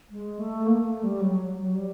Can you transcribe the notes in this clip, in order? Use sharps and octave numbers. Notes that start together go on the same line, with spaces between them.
G#3
A3
A#3
A3
G3
F#3
F#3
G3